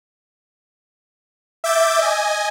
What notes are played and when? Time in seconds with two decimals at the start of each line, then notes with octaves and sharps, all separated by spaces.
1.64 E5 D6 G6 A6
1.99 D#5 G#5